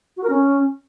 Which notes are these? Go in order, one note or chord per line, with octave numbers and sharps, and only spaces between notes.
F#4
A#4
C#4